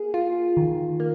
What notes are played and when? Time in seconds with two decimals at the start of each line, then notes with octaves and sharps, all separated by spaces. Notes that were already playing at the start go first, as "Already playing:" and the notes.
Already playing: A#3 G#4
0.14 F4
0.57 D#3
1.00 A#3